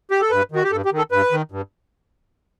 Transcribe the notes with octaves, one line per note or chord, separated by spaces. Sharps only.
G4
A4
G2 B4
D#3 F#4
G4
G2 A4
G4
D#3
A4
G2 B4
D#3
G2